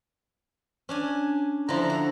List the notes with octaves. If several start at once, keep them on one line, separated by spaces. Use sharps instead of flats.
C#4 D4 G#5
D3 F3 E4 A#5
F#4